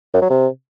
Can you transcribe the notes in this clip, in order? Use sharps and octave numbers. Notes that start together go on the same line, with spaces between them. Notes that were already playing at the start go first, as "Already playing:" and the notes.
F#2
F#3
C3